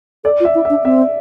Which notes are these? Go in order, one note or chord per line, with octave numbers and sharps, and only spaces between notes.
A4 D5
F4
E5
E4
D4 E5
C4 E5